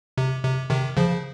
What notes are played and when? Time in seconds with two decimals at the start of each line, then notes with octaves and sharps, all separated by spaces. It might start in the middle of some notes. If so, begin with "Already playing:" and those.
0.18 C3
0.44 C3
0.70 C3 D#3
0.97 C#3 F3